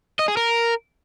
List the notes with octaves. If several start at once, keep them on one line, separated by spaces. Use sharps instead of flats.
D#5
G#4
A#4